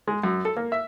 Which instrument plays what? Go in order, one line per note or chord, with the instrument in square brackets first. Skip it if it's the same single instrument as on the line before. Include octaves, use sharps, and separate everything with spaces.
[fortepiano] G#3
F#2
A4
A#3
E5